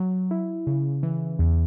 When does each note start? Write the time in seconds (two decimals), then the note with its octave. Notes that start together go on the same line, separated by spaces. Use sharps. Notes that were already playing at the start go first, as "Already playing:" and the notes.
Already playing: F#3
0.31 E4
0.67 C#3
1.03 E3
1.39 E2